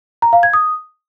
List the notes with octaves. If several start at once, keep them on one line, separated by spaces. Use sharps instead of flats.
A#5
F5
G#6
D#6